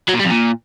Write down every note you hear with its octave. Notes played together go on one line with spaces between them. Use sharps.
F#3
A#2
G3
F2
A#2